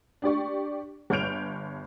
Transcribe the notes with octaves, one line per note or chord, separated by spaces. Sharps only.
D4 G4 D5 C#6
G1 C#5 F6 G6 D7 F7